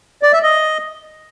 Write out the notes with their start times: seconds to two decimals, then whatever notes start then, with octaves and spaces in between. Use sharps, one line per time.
0.23 D5
0.33 E5
0.43 D#5